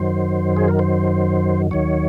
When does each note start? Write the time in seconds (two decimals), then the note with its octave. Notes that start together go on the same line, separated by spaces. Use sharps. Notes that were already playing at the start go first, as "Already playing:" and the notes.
Already playing: F#2 D#3 F#3 C5
0.56 G#4
0.68 A#4
0.79 C5
1.71 D#2 D#3 F#3 C#5